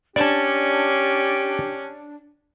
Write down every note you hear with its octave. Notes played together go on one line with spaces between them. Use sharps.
C#4 D4 G4 D5 A5